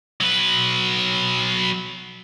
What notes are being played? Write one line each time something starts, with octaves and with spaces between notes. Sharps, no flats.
F#3 B4